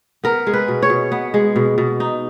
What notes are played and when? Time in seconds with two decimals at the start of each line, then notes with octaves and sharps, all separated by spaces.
0.24 B3 A#4
0.47 G#3
0.53 B4
0.68 B2
0.83 C#5
0.90 B2
1.12 B3
1.34 G#3
1.56 B2
1.78 B2
2.00 D#4